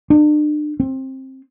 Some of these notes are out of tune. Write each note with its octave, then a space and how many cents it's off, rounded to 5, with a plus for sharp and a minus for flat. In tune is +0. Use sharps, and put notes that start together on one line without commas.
D4 +40
C4 +20